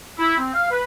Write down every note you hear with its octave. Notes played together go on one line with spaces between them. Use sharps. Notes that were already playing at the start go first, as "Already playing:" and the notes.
E4
C4
F5
B4